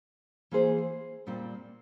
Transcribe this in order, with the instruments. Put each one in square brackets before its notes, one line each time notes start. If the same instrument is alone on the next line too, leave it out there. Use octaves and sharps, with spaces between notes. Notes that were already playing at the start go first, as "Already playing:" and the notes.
[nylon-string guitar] E3 A#3 F4 G#4 C5
A#2 G3 C4 F4